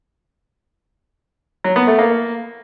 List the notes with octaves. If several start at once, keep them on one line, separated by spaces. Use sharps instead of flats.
F#3
B3
A3
A#3